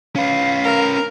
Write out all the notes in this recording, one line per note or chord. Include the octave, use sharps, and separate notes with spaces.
C#4 B4 F5
A#4